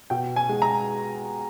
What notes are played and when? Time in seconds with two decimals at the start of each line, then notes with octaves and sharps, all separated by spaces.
0.10 B2 G5
0.36 G#5
0.49 G#3
0.62 A#5